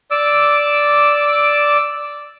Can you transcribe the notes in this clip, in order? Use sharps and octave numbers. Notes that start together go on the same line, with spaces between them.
D5 D6 E6